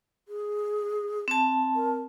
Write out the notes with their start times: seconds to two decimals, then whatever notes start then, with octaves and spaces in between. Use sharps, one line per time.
0.28 G#4
1.28 C4 A5
1.76 A#4